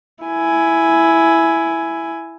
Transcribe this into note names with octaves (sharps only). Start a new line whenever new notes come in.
E4 G#5